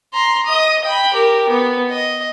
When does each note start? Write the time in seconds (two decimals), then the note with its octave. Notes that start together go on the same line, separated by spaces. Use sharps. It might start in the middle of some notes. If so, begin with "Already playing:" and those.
0.14 A#5 C6
0.46 D#5 D#6
0.84 G5 B5
1.14 G4 A#4
1.49 B3
1.90 D#5